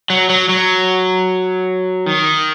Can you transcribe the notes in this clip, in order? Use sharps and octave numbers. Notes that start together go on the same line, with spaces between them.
F#3
F#3
F#3
D#3